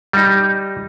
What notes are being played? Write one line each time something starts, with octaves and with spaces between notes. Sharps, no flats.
G3 D#4